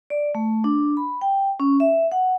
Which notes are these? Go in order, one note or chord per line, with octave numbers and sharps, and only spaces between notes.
D5
A3
D4
B5
G5
C#4
E5
F#5